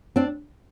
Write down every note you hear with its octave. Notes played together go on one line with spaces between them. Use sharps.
C4 D4